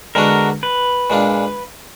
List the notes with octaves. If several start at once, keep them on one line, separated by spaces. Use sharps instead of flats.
D3 G#3 B3 D4 F#4 A#4
B4
A#2 G#3 D4 F4